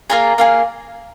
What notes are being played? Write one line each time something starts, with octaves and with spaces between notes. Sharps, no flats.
A#3 F4 G#4 A#5
A#3 F4 G#4